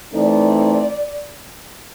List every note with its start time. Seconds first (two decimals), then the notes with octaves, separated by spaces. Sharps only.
0.13 E3 A3 C4 D#4 D5